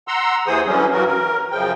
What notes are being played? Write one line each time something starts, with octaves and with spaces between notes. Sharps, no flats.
F#5 A#5 C6 E6
D#2 E3 G#4 C5 D#6
D3 E3 F#3 G3 C#4
G2 E3 F#3 F#4 A#4
A#4
F#2 C#3 F3 G5